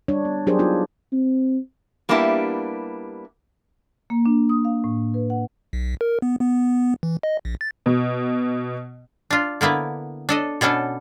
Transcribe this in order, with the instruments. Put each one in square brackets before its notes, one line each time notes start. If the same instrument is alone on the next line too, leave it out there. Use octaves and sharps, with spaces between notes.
[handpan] G3 D4 C#5
B3
F#3 D4 G4 G#4 A#4 C5
B3 D4 D#4 F4
[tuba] C4
[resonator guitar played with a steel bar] G3 A#3 B3 D4 E4 G4
[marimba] A#3
D4
D#6
F5
A2
B4
F#5
[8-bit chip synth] B1
A#4
B3
B3
E3
D#5
A#1
A6
[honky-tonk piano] B2
[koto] D4 F4
D3 A#3 B3 E4
D4 A4 D#5
B2 B3 C#4 D4 A4